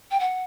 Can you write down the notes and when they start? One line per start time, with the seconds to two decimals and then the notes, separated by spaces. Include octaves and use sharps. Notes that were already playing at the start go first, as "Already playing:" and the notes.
0.11 G5
0.20 F#5